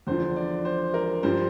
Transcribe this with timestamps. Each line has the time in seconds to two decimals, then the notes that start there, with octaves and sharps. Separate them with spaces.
0.07 E2 D3 F3 C5
0.36 D5
0.65 C5
0.94 A#4
1.23 G2 F3 C5